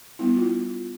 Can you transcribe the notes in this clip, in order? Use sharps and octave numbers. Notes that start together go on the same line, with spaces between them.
G3 B3 D4 E4
F4